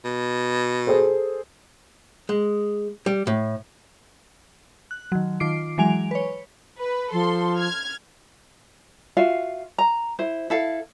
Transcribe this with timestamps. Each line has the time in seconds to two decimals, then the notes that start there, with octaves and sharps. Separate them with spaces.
0.05 B2
0.87 G#4 A4 C5
2.29 G#3
3.06 G3
3.27 A2
4.91 F#6
5.12 D#3 F#3
5.40 D#3 F4 D6 C7 D7
5.78 E3 F#3 G#3 G#5 D7 F7
6.11 B4 C#5
6.79 B4
7.12 F3 A4 C6
7.58 F6 G#6
9.17 F4 F#4 E5 F5
9.78 A#5
10.19 E4 C5
10.50 E4 A4 F5